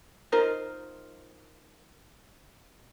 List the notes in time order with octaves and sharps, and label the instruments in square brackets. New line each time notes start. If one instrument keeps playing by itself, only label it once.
[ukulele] D#4 F4 A#4 C5